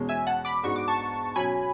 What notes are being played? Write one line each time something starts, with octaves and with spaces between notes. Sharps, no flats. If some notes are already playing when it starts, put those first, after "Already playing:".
Already playing: E2 B2 G#3 C#4
E5 G#5
F#5 A5
B5 D6
G#2 G#3 B3 D4 F#4 C#6
D6
A5 C#6
B2 F#3 C#4 G#5 B5